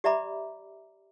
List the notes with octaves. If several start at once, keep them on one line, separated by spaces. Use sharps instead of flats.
G4 D5 E5 A#5 B5 D6